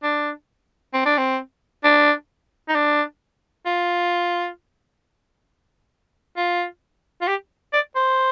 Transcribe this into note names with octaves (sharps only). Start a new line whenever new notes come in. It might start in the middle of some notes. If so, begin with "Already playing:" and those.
D4
C4
D4
C4
D4
D#4
D4
F4
F4
F4
G4
D5
C5